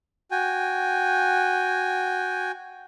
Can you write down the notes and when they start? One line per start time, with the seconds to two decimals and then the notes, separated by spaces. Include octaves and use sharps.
0.31 F#4 G5 G#5